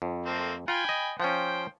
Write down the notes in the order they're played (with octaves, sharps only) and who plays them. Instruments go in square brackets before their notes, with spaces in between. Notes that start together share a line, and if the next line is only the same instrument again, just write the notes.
[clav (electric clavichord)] F2
[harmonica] A3 A#3 C4
[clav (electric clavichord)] F4 [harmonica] G5 G#5 B5
[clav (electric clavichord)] D#5
[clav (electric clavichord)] F3 C#4 [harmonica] C5 G5